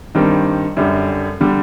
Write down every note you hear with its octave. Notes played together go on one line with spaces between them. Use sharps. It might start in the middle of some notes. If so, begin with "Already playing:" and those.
G2 D#3 G3 C4
F#2 D3 G3
D3 G3